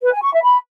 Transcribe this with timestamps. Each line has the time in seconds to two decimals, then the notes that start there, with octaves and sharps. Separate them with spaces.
0.03 B4
0.13 G#5
0.23 C#6
0.33 E5
0.43 B5